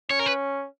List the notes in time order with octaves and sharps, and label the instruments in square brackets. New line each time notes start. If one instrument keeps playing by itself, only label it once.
[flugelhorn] C#4 [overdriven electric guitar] C#5
[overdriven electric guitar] A#4
B4